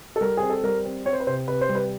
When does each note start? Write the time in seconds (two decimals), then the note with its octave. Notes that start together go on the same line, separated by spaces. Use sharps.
0.16 A4
0.21 G3 A#4
0.37 C4 G#4
0.50 A4
0.63 G3 A#4
0.85 C4
1.05 C4 C#5
1.13 C5
1.20 B4
1.27 C3 C5
1.48 C3 B4
1.61 C5
1.69 G3
1.75 B4